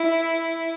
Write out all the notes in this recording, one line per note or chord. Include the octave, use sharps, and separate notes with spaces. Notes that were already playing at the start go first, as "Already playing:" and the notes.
Already playing: E4